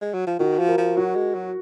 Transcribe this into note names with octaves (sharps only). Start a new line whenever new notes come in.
G#3
F#3
F3
D#3 F#4
F3
A#4
F3
F#3 F#4
G#3
F#3